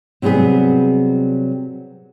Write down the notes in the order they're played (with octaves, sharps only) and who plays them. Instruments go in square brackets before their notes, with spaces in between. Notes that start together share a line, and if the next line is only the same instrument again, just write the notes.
[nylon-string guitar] C3 F#3 G3 B3 G#4